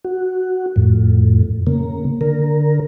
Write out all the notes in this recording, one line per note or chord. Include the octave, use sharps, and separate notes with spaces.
F#4
F2 A2
C#3 A#3
D3 A#4